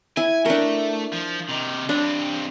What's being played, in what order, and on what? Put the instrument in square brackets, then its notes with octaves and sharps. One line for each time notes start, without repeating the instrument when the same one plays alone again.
[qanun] E4 [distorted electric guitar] G#5
[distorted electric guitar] A3 [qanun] D4 A#4
[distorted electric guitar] F3
C3 D#3
[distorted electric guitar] G2 C4 [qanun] D4